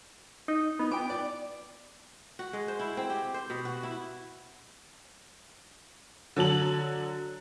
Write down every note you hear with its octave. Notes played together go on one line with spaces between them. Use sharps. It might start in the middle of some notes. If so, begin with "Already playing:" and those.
D#4
B3 D#4
B3 G5 D6
D5
F#4
G#3
C5
E4
C4
G4
C5
B2
F#4
E4
D3 F#3 A5 F#7